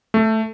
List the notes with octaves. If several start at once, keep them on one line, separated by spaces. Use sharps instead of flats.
A3